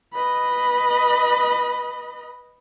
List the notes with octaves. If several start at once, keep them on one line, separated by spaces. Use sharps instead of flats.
B4 D#5